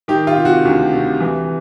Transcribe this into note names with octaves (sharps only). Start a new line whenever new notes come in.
D#3 G4
F4
C3
F#4
D2
C3
E3